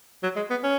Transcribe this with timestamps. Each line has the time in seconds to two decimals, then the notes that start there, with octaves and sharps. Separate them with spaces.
0.23 F#3
0.36 G#3
0.50 B3
0.63 C#4